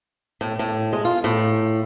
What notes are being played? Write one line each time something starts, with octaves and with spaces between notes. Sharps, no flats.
A2
A2
G#3
F4
A2